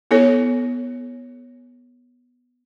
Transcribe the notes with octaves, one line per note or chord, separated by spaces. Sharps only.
B3 E4 A4 C#5